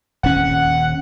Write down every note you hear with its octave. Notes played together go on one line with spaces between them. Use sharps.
D#1 C#4 F#5